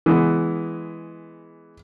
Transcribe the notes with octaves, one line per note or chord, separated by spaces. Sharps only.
E3 G#3 B3